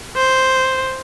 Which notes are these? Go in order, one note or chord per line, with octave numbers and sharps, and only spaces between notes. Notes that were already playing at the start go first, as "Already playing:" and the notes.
C5